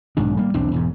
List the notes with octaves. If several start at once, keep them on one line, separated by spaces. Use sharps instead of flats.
B1 G#2 D#3 D4
G3 A#3
B1 E2 C4 D4
E1 E2 G#2